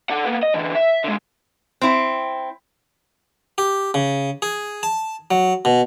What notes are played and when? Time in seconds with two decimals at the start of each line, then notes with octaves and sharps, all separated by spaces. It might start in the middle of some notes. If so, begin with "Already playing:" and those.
0.10 A4 F#5
0.25 A#3 B3
0.43 D#5
0.54 D3 E3
0.75 E5
1.04 D3 G#3
1.82 C4 E4
3.58 G4
3.94 C#3
4.42 G#4
4.83 A5
5.31 F#3
5.65 B2